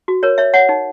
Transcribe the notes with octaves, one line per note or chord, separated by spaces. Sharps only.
F#4
A#4 C#5
C#5 E5
C#5 F#5
D#4